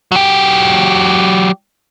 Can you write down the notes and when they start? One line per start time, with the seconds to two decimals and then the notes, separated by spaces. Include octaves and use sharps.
0.12 F#3 G4